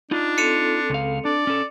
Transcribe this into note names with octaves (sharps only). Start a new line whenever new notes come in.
D4 D#4 F4
C4 A4 C#7 D#7 F7
C#2 F5
D4 D5
C#4 A4